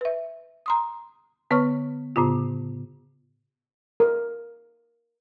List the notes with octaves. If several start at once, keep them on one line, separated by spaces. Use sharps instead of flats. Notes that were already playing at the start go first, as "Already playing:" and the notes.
B4 E5
A#5 C6 D#6
D3 B3 B4 C#5 C#6 F6
A2 C#3 B3 F4
A#4